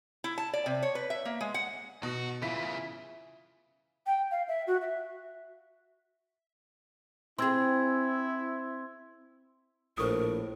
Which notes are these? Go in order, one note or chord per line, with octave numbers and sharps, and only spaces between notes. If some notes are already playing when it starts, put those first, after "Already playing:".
E4
A5
D5
C3
C#5
B4
E5
A#3
G#3
F#5
B2 F#4
C#3 E3 E4 F4 G#5 B6
G5
F5
E5
F#4
E5
C4 E4 G#4 C6 E6 G#6
A#1 A2 A#4 C5 C#6 D#6